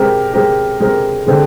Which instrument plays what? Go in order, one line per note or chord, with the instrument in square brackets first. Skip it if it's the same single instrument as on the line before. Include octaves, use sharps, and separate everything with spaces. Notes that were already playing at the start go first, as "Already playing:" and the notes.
Already playing: [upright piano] G#3 C4 G4 A#4
G#3 C4 G4 A#4
G#3 C4 G4 A#4
D3 G#3 C4 G4